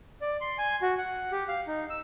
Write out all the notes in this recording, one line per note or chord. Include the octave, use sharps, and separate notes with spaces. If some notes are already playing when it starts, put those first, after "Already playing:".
D5
C6
G#5
F#4
F#5
G4
F5
D#4
E6